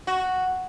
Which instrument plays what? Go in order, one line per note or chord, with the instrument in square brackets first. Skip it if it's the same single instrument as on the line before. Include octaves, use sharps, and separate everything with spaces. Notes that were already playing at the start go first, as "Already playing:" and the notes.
[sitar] F#4